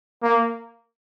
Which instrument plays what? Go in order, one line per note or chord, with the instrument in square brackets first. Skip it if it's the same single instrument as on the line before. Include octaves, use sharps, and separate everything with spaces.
[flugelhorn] A#3